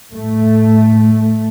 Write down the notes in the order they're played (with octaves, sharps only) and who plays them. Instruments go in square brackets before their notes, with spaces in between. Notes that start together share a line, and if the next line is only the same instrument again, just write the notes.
[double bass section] A2 A3